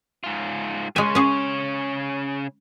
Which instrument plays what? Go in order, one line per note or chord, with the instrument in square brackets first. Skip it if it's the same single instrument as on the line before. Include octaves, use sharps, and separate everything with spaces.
[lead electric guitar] G#2 F4
[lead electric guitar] C#3 C#5 [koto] G#3 G#5
[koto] C#4 G#4